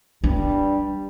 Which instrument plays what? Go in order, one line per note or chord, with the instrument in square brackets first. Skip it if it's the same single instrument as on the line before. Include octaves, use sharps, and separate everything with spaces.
[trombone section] G2 G3 [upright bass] D4